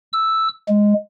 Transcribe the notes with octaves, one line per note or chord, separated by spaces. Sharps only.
E6
G#3